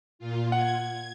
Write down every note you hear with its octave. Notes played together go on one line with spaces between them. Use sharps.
A#2 F4
F#5 G#6